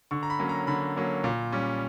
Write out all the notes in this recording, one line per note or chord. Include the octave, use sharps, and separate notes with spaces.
D3 C#6
A#5
B5
F#3 A#3 C#4
A#5
D3 B5
F#3 A#3 C#4
A#2
G3 C#4